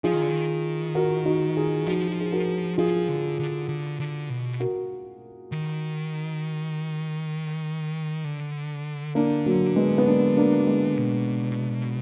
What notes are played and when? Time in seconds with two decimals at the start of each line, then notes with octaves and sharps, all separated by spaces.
0.04 F3 F4 G#4
0.13 D#3
0.22 D3
0.30 D#3
0.95 F#4 A#4
1.25 D#4 F#4
1.56 F4 G#4
1.87 F3 D#4 F#4
2.08 F#4
2.21 G#4
2.32 F#4 A#4
2.78 F3 F4 G#4
3.08 D3
3.39 D3
3.69 D3
4.00 D3
4.29 B2
4.60 F#4 A#4
5.52 D#3
8.24 D3
9.15 D3 A#3 D4
9.46 F#3 A#3
9.76 G#3 B3
9.98 B3
10.07 A#3 D4
10.37 A#3 D4
10.67 G#3 B3
10.98 B2